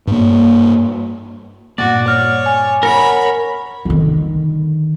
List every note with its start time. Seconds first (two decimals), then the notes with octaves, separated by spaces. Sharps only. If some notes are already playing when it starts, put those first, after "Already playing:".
0.07 G2 A#3
1.78 G2 A#2 A#3 F#4 D5
2.08 C#5 F6
2.46 G#5
2.83 A#4 C#5 F#5 A#5 B5
3.85 D3 D#3